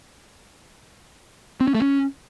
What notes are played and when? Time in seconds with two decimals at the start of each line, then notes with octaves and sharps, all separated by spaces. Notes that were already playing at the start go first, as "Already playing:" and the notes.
1.60 C4
1.68 C#4
1.75 A3
1.82 C#4